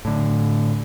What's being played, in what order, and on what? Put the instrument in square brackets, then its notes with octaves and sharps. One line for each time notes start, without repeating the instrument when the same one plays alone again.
[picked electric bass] A2 D3